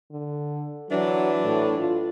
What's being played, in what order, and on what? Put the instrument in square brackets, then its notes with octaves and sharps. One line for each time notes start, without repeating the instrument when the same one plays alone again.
[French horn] D3
[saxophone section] E3 D4 [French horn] F#3
[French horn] A2
F4